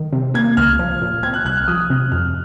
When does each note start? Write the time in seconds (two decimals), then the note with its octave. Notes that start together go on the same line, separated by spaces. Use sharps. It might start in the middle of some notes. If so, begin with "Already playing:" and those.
Already playing: D#3
0.13 C3
0.34 A#3 G#6
0.57 C#2 F6
0.79 F3
1.01 A#2
1.23 C4 G#6
1.34 F#6
1.45 C2 F#6
1.57 F6
1.67 F3 D#6
1.90 C3
2.12 F2 F6